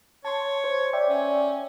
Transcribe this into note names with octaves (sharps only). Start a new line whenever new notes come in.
C#5 A5 C6
C5
D5 E5 G5
C#4